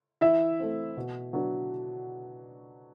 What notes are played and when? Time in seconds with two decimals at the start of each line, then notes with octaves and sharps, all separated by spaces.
0.21 E3 E4 E5
0.60 A3 C4
0.97 B2
1.33 F#3 B3 D4